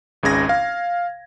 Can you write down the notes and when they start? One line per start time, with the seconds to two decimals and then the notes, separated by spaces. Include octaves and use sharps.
0.23 G#1 C#2 C#3 G#6 A#6
0.49 F5